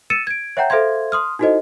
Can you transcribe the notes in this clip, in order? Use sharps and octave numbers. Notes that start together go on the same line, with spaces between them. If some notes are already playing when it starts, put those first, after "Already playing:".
E6 A6 C#7 D#7 E7
G#6 D7
C#5 E5 F#5 G5 A#5 G6
A4 C5 E5 F5 C6 G#6
C6 D#6 F6
D#4 E4 F#4 A4 C5 D#5